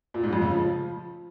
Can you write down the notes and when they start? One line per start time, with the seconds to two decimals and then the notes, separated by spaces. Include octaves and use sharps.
0.14 A#2
0.23 G#2
0.33 F2
0.42 C#3
0.51 F3